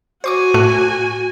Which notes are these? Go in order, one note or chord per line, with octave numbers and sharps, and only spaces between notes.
F#4 C5 G#5 C#6 D6
A2 A3 F#6